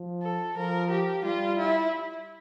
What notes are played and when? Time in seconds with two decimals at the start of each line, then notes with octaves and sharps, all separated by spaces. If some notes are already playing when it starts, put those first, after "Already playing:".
Already playing: F3
0.22 A4
0.57 F3 A#4
0.90 G4
1.24 G3 F4
1.58 E4